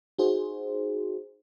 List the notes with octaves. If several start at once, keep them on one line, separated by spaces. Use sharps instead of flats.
D#4 F#4 G#4 C5